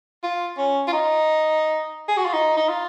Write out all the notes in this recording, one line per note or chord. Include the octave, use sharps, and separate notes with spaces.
F4
C#4
F4
D#4
G#4
F#4
F4
D#4
D#4
F4